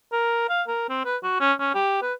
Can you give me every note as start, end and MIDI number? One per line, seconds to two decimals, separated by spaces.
0.12 0.48 70
0.49 0.63 77
0.68 0.89 70
0.89 1.03 60
1.05 1.17 71
1.23 1.37 66
1.40 1.53 61
1.60 1.74 61
1.74 2.01 67
2.02 2.14 71